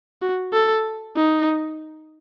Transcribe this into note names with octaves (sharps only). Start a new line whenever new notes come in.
F#4
A4
D#4